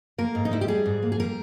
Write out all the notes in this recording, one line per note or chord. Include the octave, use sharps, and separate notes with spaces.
A#3 A#4
G#2
D#4
G3 E4
G4
G3 G#4
G#2
A#3
G#4
G3 A#4